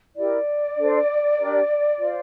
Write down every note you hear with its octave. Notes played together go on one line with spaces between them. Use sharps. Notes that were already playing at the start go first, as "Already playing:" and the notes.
E4 G4 A#4 D5
D4 A4 C5
D4 G4 A#4
F4 C5